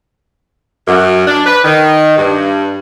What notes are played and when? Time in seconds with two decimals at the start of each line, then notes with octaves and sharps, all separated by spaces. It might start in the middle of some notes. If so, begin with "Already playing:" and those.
0.87 F#2
1.26 D4
1.46 B4
1.64 D#3
2.17 G2